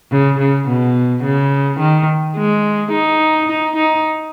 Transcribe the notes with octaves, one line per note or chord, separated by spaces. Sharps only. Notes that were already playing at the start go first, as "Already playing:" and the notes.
C#3
C#3
B2
C#3
D#3
G#3
D#4
D#4
D#4